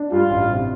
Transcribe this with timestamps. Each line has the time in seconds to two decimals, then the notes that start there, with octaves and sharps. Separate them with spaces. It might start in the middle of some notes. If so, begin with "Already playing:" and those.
Already playing: D4
0.11 G2 F4
0.30 A1
0.49 C3